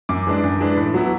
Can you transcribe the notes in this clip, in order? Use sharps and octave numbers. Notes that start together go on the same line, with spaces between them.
F#2 D6
E3 G#3 D4
F#2
E3 G#3 D4
A2
F#3 B3 E4